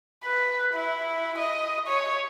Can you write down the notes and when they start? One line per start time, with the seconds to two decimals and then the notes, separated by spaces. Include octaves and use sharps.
0.24 B4
0.73 E4
1.38 D#5
1.87 C#5